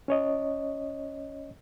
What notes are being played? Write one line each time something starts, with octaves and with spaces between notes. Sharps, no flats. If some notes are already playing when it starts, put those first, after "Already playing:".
C#4 C#5 D#5